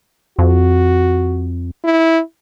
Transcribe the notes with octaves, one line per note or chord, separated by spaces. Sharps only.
F2 F#4
E4